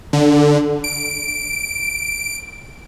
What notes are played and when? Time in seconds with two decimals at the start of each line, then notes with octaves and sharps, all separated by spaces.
0.13 D3
0.84 D7